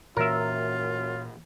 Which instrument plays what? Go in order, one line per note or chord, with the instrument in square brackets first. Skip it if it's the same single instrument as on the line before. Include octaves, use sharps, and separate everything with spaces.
[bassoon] F#2 [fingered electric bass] A#2 E3 A#3 [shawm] F4 [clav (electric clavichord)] A#4 E5